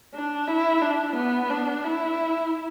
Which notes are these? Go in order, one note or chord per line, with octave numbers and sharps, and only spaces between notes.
D4
E4
D4
B3
D4
E4